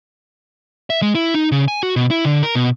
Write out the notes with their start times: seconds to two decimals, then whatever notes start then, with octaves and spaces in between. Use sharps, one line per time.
0.90 E5
1.02 G#3
1.15 E4
1.34 D#4
1.52 C#3
1.68 G#5
1.83 F#4
1.96 B2
2.10 E4
2.25 D3
2.43 A#4
2.55 B2